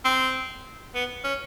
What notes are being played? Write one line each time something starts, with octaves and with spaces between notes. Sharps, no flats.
C4
B3
C#4